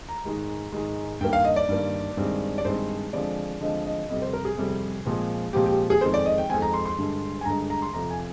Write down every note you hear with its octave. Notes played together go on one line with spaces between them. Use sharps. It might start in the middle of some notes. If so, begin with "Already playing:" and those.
A#5
G#2 D#3 G#3
G#2 D#3 G#3
G2 D#3 A#3 G5
F5
D#5
D5
G2 D#3 A#3
G2 D#3 G#3 C4
D5
G2 D#3 G#3 C4 C5
D3 F3 G#3 C4 D5
D3 F3 G#3 C4 D#5
D#5
F2 C3 G3 C4 D#5
C5
A#4
G#4
F2 C3 G3 C4
A#2 F3 G#3 C4
A#2 F3 G#3 C4 G4
G4
G#4
F2 D#3 G#3 C4 C5
D5
D#5
G5
F2 D#3 G#3 C4 G#5
A#5
C6
C6
G2 D3 G#3
G#5
G2 D3 G#3 A#5
A#5
C6
F2 C3 F3 A#5
G#5